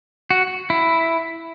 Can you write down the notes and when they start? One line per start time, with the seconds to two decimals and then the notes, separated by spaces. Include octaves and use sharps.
0.30 F#4
0.70 E4